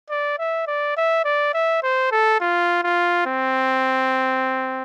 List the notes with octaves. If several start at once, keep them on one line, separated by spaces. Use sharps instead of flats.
D5
E5
D5
E5
D5
E5
C5
A4
F4
F4
C4